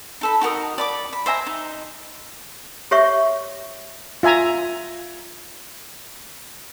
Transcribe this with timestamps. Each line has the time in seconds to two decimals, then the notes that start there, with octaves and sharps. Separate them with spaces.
0.21 D#4 A4 B5
0.41 D#4 F#4 A#4 D#6
0.78 D5 B5 D6
1.13 B5
1.26 C5 E5 G#5 A#5
1.47 D#4
2.91 G4 C#5 E5 C#6
4.23 F4 E5 G#5 A#5